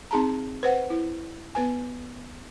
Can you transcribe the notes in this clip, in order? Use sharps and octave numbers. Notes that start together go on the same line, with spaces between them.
C4 D#4 G#4 A5 A#5
B4 C5 F#5
E4
B3 B4 G#5